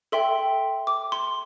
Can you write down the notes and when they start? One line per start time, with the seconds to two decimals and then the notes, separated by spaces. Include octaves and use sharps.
0.12 A4 E5 G5 C6
0.87 D6
1.12 C6